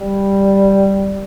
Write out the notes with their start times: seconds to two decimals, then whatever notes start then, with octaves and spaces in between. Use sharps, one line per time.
0.01 G3